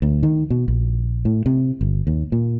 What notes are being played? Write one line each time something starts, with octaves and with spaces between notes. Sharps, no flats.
D2
D#3
B2
A#1
A2
C3
G1
D#2
A#2